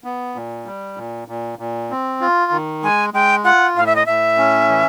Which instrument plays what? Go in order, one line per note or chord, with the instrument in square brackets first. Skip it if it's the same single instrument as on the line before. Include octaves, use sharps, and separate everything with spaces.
[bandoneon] B3
A#2
G3
A#2
A#2
A#2
C4
F4
D#3
[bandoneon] G#3 [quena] G#5
[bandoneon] G#3 [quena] G5
[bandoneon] F4 [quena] F#5
[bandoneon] A2 [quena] F5
[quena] E5
D#5
[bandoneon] A2 [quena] E5
[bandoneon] C#4
E3